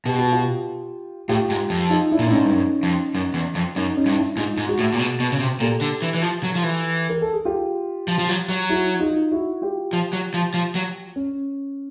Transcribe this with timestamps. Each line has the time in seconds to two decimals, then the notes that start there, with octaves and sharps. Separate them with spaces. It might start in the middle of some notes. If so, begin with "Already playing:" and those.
0.05 B2 G4
0.18 F#4
0.32 F4 G4
1.29 A2 F4 G4
1.50 G#2
1.70 F2
1.90 D#4 F4
2.11 D4 E4
2.19 A#2
2.27 A2
2.31 G#2 C#4 D#4
2.44 G2
2.52 F#2
2.83 F2
3.15 F#2
3.34 E2
3.55 F2
3.75 F#2 C#4 D#4
3.96 C#4 D#4
4.06 G2
4.17 D4 E4
4.37 G#2 D#4 F4
4.57 G#2
4.68 F#4 G#4
4.79 A2
4.94 A#2
4.99 B2
5.20 B2
5.32 C#3
5.40 C3
5.60 A#2 G4 A4
5.81 D3
6.02 E3
6.15 E3
6.22 F3
6.43 F#3
6.55 F3
6.63 E3
7.10 A#4
7.21 A4
7.33 G#4
7.45 F4 G4
8.08 F3
8.19 F3
8.29 F#3
8.49 F#3
8.69 E4 F#4
9.00 D#4 F4
9.31 E4 F#4
9.62 F4 G4
9.93 F3
10.13 F#3
10.34 F3
10.54 F3
10.75 F#3
11.16 C#4